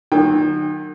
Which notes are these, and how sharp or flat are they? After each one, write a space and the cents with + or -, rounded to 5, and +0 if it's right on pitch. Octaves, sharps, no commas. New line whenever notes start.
D#3 -30 F#3 +10 G5 +25